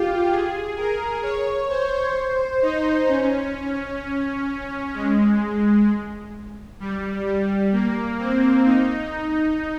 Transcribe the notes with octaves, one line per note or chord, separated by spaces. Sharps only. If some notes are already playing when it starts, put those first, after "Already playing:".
Already playing: F4 G4
G#4
A#4
C#5
C5
D#4
C#4
G#3
G3
G3
A#3
C4
D#4